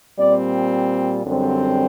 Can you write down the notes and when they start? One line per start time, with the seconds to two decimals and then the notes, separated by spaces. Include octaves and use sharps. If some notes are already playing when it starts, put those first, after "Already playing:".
0.17 A#2 G3 C4 D5
1.25 F#2 D3 G3 C4